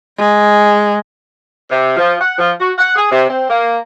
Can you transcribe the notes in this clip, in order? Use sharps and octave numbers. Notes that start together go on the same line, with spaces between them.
G#3
C3
F3
F#5
F3
F#4
F#5
G#4
C3
C4
A#3